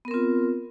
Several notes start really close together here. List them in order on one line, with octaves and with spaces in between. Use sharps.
B3 A#4 C4 F4